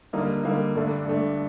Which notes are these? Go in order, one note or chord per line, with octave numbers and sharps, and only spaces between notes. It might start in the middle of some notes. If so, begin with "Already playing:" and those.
D3 G3 A#3 D#4
D3 G3 A#3 D#4
G2 D3 A3 D4
G2 D3 A3 D4